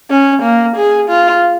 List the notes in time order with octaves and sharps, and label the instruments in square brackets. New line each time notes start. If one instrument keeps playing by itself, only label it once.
[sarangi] C#4
A#3
G#4
F4